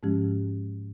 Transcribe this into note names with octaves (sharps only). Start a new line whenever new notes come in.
G#2 F3 G#3 C#4 G4